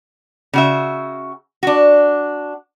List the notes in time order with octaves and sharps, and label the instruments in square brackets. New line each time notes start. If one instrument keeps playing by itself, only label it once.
[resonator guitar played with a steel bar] C#3 F#4 E5
D4 F#4